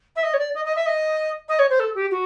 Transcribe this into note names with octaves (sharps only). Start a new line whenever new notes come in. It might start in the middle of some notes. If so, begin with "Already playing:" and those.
E5
D#5
C#5
D5
D#5
D#5
E5
D#5
D#5
C#5
C5
A4
G4
F#4